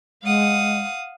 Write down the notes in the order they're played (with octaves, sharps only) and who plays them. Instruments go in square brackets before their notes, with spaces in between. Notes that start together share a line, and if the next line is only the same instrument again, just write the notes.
[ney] G#3 [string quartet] F5 F#5 D#6